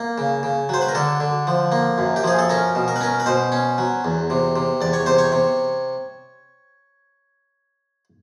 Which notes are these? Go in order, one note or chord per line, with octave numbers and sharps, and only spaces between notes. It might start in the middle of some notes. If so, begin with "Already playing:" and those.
Already playing: A#3
C#3
C#3
F#3 C5
B4
A#4
D3 A4
D3
F3
A#3
F#2
G4
F3 G#4
A4
C#4 A#4
B2
A#4
B4
C#4 A#4
B4
B2 C5
C#4
F#3
E2
C3
C3
E2 D5
C#5
C3 C5
C#5
C3